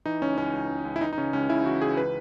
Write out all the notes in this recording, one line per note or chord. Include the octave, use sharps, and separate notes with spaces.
E3 D#4
C#2 C#4
C#2 C#4
C#2
C#2
C#2
E4
E3 D#4
D#4
C#3 C#4
C#2 C#4
C#3 E4
E3 F#4
C#2 G#4
B4